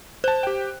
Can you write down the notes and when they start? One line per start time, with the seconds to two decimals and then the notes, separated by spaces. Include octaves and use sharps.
0.24 C5 A5 F#6
0.43 G4 G5